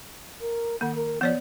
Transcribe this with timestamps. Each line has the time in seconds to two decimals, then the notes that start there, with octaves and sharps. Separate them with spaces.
0.41 A#4
0.81 D#3 A#3 F#5
0.95 A#4
1.21 F3 B3 C#5 D5